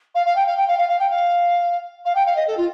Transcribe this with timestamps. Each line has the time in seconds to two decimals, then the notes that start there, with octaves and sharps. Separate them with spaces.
0.15 F5
0.26 F5
0.36 G5
0.47 F5
0.57 G5
0.68 F5
0.78 F5
0.89 F5
0.99 G5
1.10 F5
2.05 F5
2.15 G5
2.26 F5
2.36 D#5
2.47 A4
2.57 F4